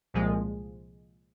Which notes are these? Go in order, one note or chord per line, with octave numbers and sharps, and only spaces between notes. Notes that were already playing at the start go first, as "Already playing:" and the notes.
C2 A#2 F3 G#3